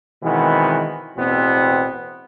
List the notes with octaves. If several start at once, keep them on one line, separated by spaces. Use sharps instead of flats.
B2 D#3 E3 G#3 B3 C4
A1 E2 B2 B3 C4